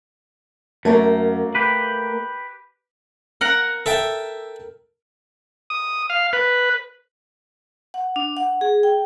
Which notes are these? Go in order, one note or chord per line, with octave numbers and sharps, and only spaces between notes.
F#2 A3 A#3 A#4
G4 B4
A#4 F#5 A#5
A4 E5 G5
D#6
F5
B4
F#5
D4
F#5
G#4
G5